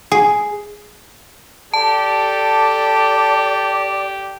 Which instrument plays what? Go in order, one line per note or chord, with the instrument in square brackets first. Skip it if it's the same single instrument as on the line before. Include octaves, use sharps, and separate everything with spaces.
[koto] G#4
[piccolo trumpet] G4 [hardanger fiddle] A4 [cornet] D5 [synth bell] A5